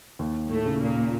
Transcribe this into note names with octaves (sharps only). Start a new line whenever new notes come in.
D#2
A2 A3
C#3
A#2 A#3